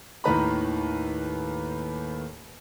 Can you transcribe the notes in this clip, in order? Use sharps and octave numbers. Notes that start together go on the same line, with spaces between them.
D#2 A2 D#3 B4 A#5 B5